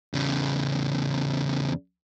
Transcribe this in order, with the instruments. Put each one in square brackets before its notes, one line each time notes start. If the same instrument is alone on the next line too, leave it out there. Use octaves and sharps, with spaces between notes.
[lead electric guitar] E2 C#3